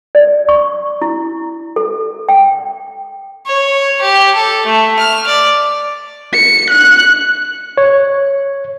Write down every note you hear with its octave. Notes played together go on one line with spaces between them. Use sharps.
D5
C#6
E4
A4
G5
C#5
G4
A4
A3
F6
D5
C#7
F#6
C#5